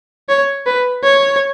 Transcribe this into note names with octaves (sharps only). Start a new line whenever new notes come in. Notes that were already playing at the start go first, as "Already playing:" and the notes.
C#5
B4
C#5